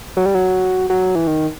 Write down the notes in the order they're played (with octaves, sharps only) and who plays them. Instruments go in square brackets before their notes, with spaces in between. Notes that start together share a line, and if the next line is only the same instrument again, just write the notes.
[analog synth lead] F#3
G3
F#3
F#3
E3
D#3